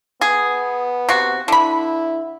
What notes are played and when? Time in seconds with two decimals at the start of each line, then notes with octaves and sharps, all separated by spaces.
0.21 B3 G#4
1.09 C3 F#4
1.48 D3 E4 B5